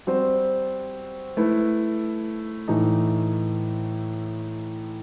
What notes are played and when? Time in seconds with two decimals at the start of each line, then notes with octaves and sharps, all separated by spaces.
0.07 G3 C4 F#4 C5
1.37 A3 E4 B4
2.68 A2 E3 A3 D#4